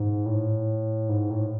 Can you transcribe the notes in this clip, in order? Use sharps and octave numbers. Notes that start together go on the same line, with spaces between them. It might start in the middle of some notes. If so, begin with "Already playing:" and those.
Already playing: G#2
A2
G#2
A2